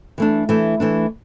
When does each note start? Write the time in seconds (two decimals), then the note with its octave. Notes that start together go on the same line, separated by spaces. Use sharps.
0.18 E3 A3 D4
0.49 E3 A3 D4
0.80 E3 A3 D4